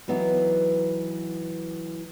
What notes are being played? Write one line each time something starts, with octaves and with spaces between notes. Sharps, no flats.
E3 F#3 B3 D#4 E4